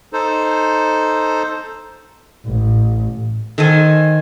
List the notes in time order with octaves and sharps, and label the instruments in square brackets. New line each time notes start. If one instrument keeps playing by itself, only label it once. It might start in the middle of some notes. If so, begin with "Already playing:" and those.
[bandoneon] D#4 A4 C5
[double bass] A1
[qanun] D#3 A4 C5 G#5